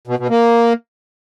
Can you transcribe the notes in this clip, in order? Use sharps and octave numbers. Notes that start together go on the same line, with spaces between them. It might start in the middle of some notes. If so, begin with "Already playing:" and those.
B2
B2
A#3